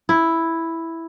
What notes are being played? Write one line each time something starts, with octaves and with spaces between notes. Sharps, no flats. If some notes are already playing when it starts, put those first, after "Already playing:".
E4